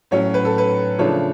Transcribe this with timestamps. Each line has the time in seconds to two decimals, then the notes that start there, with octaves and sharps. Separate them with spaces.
0.11 A2 F#3 C#4 C#5
0.34 B4
0.45 A4
0.58 B4
0.98 C#3 F3 A3 D4 C#5